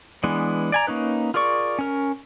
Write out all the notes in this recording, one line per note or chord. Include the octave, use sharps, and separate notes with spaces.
E3 G#3 B3 D4
D5 G#5 A#5
A#3 C#4 D#4 B4
F4 G#4 A#4 D5 C#6
C#4 A#4